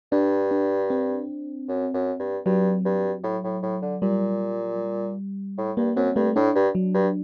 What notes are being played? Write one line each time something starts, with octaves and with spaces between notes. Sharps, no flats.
G2 D4
D4
C4
F#2
F#2
G2
G2 F#3
G2
A2
A2
A2
D3
A#2 G3
A2
G2 A#3
F#2 C4
G2 A3
A2 D4
G2
F#3
G2